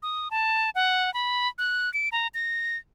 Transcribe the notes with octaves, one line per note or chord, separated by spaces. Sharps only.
D#6
A5
F#5
B5
F#6
D7
A#5
A#6